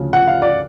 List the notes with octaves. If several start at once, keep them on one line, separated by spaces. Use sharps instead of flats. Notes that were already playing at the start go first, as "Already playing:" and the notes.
Already playing: D2 C#3 F3
F#5
F5
D5